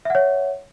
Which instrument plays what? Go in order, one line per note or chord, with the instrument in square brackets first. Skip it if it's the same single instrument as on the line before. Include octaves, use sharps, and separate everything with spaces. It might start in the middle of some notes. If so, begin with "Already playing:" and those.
[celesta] E5
F#5
C#5